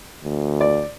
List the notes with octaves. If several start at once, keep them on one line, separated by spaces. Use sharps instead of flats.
D2
D5